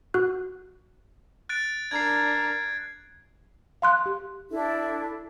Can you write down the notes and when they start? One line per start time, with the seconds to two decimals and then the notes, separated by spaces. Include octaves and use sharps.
0.14 F#4 F#6
1.49 F#6 A6 D7
1.91 D4 A#4 G#6 C7
3.82 F5 C6 F#6
4.06 G4
4.50 D4 E4 A4